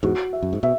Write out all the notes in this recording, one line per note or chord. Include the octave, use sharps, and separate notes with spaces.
E2 G#2 F#4
E5
F#2
G#2
B2 E5